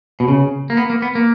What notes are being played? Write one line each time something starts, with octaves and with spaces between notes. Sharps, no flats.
B2
C#3
A#3
B3
A#3
B3
A#3